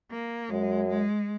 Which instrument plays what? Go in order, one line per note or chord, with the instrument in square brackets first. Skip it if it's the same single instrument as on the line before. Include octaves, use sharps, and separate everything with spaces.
[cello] A#3
[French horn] F#2 [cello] G#3
[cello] G#3